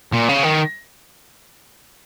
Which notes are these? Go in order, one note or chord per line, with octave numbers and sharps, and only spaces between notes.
A#2
C#3
D#3